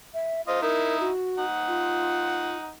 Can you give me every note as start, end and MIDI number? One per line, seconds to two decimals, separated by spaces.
0.14 0.42 76
0.48 0.59 65
0.48 0.60 72
0.48 0.59 75
0.62 1.09 63
0.62 1.09 64
0.62 0.96 70
1.00 1.45 66
1.38 2.75 63
1.38 2.75 78
1.68 2.57 65